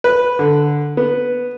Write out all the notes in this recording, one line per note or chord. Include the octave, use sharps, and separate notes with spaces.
B4
D3
B3